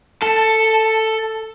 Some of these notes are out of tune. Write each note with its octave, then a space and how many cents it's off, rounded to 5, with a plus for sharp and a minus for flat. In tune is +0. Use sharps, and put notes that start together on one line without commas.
A4 +10 A5 +0